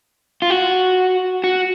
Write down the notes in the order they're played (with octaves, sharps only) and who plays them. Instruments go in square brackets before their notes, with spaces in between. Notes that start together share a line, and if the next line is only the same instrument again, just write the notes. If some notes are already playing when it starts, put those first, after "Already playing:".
[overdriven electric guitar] F4
F#4
F#4